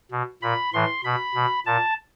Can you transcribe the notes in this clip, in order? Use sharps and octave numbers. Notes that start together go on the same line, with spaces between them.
B2
A#2 B5
A2 E3 C6
B2 B5
B2
A#2 A5